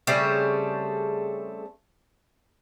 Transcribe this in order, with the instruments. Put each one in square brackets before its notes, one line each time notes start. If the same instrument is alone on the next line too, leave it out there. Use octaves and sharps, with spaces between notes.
[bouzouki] C#3 G3 A3 C4